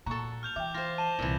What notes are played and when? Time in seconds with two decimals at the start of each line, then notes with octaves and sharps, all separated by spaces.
0.06 A#2 F#4 A4 A#5 C#6
0.43 F6 G6 F7
0.56 E3 E5 G5 D6
0.74 F4 C5 A#6
0.98 A5 D#7 E7 G7
1.19 C2 A#2 E3